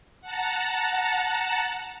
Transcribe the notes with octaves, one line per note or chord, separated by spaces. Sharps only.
F#5 A5 A#5